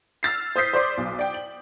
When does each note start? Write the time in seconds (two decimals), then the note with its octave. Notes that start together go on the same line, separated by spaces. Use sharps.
0.23 E6 F6 A6 C7
0.56 C5 D#6 G6 B6 C7
0.73 C5 D5 C6 D6
0.98 B1
1.19 D5 G5
1.34 F#7